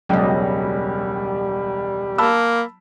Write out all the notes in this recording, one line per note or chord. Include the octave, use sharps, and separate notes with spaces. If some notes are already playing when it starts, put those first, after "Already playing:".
E1 C#2 F#3 G3 D#5
A#3 A5 B5 E6